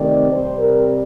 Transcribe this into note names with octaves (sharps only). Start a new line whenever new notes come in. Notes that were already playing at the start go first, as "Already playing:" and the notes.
Already playing: C3 D#3 A3 C4 D5
C3 G3 C4 C5
A#4